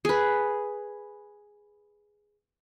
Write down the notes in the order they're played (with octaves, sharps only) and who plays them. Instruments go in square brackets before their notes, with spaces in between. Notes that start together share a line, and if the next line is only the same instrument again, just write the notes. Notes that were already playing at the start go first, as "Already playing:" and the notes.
[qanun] G#4 B4